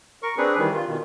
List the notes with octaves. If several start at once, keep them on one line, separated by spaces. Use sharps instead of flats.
A#4 C#6
C4 D4 G#4 B4
D#3 E3 G3
F4
B2 D#3